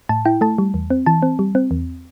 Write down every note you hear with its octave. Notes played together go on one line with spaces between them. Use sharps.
A2 A5
E4 G5
A3 A5
G3
E2
C4
E3 A5
C4
G3
C4
E2